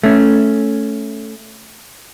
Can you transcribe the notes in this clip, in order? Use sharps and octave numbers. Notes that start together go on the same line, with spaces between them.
A3 C#4